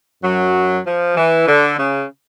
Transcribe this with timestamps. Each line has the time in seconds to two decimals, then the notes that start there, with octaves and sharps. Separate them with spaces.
0.24 F#2 F#3
0.86 F3
1.17 E3
1.48 D3
1.79 C#3